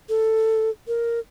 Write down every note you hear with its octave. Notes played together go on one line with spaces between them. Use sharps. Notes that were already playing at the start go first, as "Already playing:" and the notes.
A4
A#4